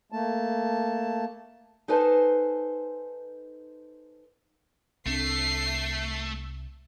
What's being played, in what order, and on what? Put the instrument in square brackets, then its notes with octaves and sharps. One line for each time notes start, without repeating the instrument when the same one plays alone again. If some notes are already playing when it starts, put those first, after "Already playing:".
[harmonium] A3 A#3 A5
[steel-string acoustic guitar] D#4 A4 B4 C5 G#5 A5
[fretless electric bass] C2 C4 D4 [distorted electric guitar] A3 [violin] C7